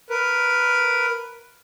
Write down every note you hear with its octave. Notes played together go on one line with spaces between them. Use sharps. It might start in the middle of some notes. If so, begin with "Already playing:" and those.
A#4 B4